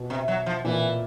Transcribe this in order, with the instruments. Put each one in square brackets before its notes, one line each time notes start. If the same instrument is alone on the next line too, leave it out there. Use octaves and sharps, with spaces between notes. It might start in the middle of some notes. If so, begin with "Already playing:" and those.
Already playing: [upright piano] B2
[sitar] C3
F#3
F3
[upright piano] A#2 [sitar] E3